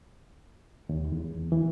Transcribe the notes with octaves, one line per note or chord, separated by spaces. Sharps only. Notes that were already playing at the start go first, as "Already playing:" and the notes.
D#2
E2
E3